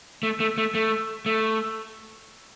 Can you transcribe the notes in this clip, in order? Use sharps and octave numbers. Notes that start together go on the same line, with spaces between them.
A3
A3
A3
A3
A3